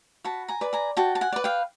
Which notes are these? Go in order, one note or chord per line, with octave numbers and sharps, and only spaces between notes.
F#4 A5 B5
G#5 A#5
B4 D5
G#5 A#5
F#4 G5 A5
A5
F#5 G#5
B4 D5
F5 G5